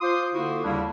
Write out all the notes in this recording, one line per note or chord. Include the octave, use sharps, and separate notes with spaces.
F4 C5 C6 D6 D#6
D3 A#3 E4 F#4
D#2 C#3 G3 A#3 D4 E4